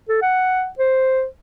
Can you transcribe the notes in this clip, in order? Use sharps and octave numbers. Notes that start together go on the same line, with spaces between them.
A4
F#5
C5